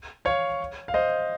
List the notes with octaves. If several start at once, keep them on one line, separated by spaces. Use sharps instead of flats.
C#5 F5
F5
C5 D#5